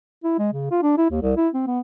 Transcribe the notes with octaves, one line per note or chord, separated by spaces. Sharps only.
E4
G#3
C#3
F4
D4
E4
D#2
C2
E4
C4
B3